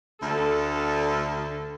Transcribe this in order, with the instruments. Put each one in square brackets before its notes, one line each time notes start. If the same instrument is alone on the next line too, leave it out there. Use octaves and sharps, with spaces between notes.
[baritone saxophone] D2 [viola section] D3 A4